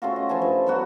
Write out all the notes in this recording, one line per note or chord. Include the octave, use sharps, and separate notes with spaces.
C#3 A3 F4 F#4
D#5
F3 E4 G#5 A5
G2
F#3 B3 F#4